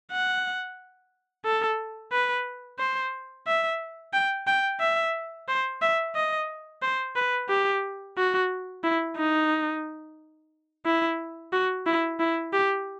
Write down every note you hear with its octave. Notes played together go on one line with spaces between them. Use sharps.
F#5
A4
B4
C5
E5
G5
G5
E5
C5
E5
D#5
C5
B4
G4
F#4
E4
D#4
E4
F#4
E4
E4
G4